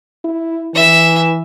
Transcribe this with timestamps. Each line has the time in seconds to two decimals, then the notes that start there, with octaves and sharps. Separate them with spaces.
0.25 E4
0.75 E3 E5